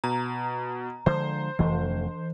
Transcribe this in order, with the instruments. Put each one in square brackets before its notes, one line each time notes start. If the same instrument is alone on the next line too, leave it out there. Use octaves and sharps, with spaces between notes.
[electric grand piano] B2 [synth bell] A#5
[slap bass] D3 F3 G#3 [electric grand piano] C5
[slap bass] F1 F2 A3 [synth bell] E3